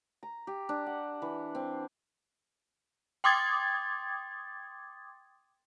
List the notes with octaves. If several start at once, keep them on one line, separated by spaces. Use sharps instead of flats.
A#5
G4
D4
F#5
E3
C4
G5 C6 D6 D#6 G#6 A6